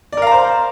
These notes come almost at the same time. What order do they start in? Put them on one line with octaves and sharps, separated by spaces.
D5 A#4 F5 A#5 C5